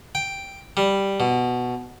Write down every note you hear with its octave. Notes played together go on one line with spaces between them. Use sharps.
G5
G3
B2